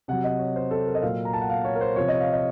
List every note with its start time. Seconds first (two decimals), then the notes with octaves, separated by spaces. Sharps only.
0.08 C3 F#3 F#5
0.24 D#5
0.39 C#5
0.56 C5
0.71 A4
0.87 A#4
0.94 D#5
1.02 A#2 F#3 F5
1.25 A#5
1.33 A5
1.41 F#5
1.50 F5
1.65 C#5
1.75 A#4
1.81 C5
1.96 C3 F3 C#5
2.08 D#5
2.20 F5
2.32 D#5